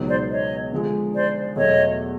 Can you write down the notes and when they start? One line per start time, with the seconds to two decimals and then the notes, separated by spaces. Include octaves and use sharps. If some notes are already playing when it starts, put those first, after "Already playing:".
Already playing: C#2 B2 F#3 B3 D#4
0.09 C5 D5
0.30 C#5 D#5
0.72 D3 F3 G#3
1.14 C5 D5
1.56 E2 B2 F#3 A3 C#5 D#5